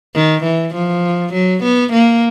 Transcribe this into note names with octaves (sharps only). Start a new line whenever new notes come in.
D#3
E3
F3
F#3
B3
A#3